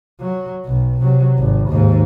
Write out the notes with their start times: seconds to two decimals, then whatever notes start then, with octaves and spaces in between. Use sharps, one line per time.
0.20 F#3
0.66 B1
1.01 C3 F#3
1.38 G#1
1.69 D#2 G#2